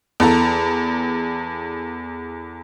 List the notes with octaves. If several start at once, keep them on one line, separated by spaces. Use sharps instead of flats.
E2 A4 A#5